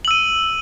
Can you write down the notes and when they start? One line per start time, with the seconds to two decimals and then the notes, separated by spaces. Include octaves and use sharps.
0.05 F#7
0.08 E6
0.11 D#7